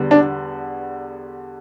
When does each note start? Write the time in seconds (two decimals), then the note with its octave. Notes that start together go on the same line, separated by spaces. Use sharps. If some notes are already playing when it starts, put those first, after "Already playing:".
Already playing: E2 D3 G3 B3
0.11 D4